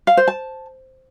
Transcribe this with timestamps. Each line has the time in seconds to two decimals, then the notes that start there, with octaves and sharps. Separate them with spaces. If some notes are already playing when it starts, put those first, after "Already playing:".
0.07 F5
0.17 C5
0.28 A5